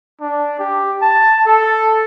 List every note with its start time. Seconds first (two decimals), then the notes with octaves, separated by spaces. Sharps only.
0.21 D4
0.59 G4
1.02 A5
1.46 A4